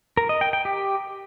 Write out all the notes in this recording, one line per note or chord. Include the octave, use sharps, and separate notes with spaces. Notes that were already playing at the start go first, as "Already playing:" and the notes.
A#4
D#5
G5
G5
G4